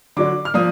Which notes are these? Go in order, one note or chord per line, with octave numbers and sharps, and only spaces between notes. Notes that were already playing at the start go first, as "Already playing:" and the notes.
D3 F#3 D4 D6
F6
F3 A#3 D4 D#6